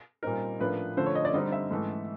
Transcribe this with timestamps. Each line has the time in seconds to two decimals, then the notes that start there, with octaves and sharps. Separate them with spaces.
0.23 A#2 G3 C4 D#4 A#4
0.59 A2 F3 A#3 D4 B4
0.97 D3 F3 A3 C5
1.06 C#5
1.15 D#5
1.25 D5
1.33 D3 G3 C4 D#4 D#5
1.52 E5
1.71 G#2 E3 A3